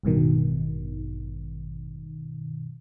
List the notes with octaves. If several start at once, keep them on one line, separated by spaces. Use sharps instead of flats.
A1 G2 B2 D#3